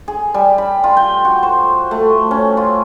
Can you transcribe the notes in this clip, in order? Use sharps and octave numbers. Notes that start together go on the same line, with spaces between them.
G#4
G3
B5
F4
G5
F#4
C5
A3
C#4
F4